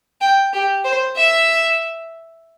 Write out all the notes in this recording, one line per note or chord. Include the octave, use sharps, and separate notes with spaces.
G5
G4
C5
E5